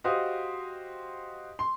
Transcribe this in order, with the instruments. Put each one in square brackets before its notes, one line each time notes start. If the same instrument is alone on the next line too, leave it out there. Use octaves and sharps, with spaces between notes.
[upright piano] F#4 G4 C5 D#5 F5 D#6
C6